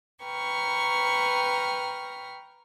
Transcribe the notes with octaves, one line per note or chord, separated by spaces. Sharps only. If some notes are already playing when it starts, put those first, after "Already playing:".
B4 G5 A#5 C#6 F6